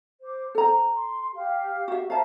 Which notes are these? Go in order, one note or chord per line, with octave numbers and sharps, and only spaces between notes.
C5 D6
A4 C5 A#5
C6
G4 F5
F#4 E5
C5 E5 F5 A5 A#5